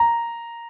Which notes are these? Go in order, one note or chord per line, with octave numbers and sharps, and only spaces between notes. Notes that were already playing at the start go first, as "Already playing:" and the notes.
Already playing: A#5